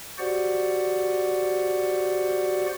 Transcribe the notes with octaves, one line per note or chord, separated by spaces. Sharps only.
F#4 G4 C5 D5 F#5